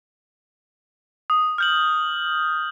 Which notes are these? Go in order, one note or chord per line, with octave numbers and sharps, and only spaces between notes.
D#6
F6 G6 F#7